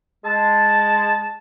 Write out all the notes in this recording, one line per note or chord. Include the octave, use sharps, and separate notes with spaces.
G#3 A5